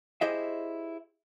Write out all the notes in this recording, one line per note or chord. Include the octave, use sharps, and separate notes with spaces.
E4 G4 G#4 C5 D#5 E5